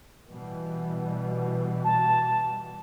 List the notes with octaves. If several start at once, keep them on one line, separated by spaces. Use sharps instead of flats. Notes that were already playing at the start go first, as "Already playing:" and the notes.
B2 E3 G3
A5